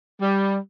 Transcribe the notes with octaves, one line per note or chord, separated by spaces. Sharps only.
G3